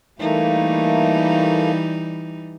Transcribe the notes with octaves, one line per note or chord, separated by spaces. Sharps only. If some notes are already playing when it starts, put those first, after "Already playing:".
E3 G3 A3 A#3 D#4